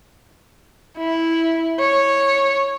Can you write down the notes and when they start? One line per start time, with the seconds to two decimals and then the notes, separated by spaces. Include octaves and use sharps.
0.98 E4
1.80 C#5